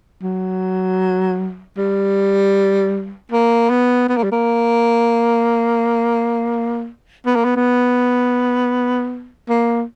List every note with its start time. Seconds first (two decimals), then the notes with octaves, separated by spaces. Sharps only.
0.23 F#3
1.77 G3
3.32 A#3
3.70 B3
4.09 B3
4.17 A#3
4.24 G3
4.32 A#3
7.26 B3
7.35 A#3
7.44 B3
7.56 B3
9.49 A#3